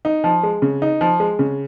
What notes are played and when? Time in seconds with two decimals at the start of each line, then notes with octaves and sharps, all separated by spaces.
0.05 D#4
0.24 F3
0.43 G#3
0.62 C#3
0.82 D#4
1.01 F3
1.20 G#3
1.39 C#3